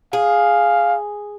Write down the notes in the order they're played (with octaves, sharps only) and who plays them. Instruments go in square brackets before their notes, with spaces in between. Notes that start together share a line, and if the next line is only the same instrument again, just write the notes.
[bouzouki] G#4 [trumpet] F5